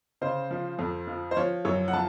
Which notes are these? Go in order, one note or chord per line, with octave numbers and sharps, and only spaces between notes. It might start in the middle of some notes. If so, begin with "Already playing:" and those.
C#3 C5
F3
F2
F3
C5
F3 C#5
F#2 C#5
F#5
F3 A5